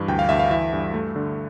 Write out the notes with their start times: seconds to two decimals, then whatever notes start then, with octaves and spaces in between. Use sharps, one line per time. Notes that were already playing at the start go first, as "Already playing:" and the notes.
Already playing: G2 E3
0.08 D2 G5
0.19 F5
0.29 D2 E5
0.39 F5
0.51 E3 E5
0.73 G2
0.94 A3
1.16 D3